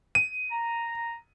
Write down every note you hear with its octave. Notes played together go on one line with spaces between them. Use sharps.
D#7
A#5